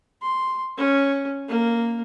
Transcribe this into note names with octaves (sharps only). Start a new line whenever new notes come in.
C6
C#4
A#3